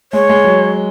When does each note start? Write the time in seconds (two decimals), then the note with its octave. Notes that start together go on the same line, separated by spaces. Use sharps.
0.13 G#3 C#5
0.29 G#3
0.44 F#3